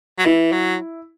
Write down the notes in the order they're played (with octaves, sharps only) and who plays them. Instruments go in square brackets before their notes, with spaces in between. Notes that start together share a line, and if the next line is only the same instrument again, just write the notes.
[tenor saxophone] F#3
[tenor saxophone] E3 [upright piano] E4
[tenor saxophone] F#3